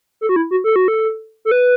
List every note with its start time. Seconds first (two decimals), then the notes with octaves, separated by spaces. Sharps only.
0.21 A4
0.29 F#4
0.36 E4
0.51 F#4
0.64 A4
0.76 F#4
0.88 A4
1.45 A4
1.51 B4